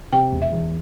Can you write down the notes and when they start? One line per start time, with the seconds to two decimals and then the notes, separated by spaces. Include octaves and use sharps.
0.12 C3 G5
0.32 E1
0.42 E5
0.52 E2